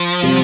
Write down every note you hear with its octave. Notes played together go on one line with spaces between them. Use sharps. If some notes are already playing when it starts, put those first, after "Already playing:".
Already playing: F3
C3 G3 C4